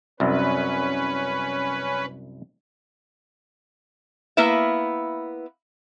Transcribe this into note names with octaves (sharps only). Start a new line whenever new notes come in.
C2 F#2 C#4 B4
A#3 B3 E4 B4 E5